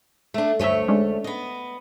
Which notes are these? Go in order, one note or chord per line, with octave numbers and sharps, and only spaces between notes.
A3 D4
D2 G2 A3 C#5 E5
G#3 C#4 D4
B3 D#5